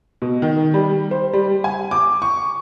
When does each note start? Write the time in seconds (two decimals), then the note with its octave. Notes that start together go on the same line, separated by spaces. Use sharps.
0.22 B2
0.42 D#3
0.74 G3
1.11 C5
1.33 G3
1.64 G#5
1.91 D6
2.22 C#6